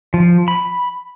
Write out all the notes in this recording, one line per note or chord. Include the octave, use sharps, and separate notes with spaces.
F3
B5